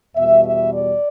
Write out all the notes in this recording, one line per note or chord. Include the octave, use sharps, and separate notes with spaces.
E2 B2 G3 E5
E5
D5